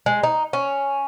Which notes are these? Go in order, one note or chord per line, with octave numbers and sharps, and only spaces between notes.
G#3
D#4
C#4